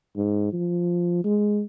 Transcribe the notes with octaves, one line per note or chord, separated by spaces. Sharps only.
G#2
F3
G#3